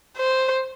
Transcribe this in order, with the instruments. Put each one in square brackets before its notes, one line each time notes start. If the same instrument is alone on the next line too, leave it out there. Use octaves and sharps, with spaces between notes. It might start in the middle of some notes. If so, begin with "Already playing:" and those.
[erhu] C5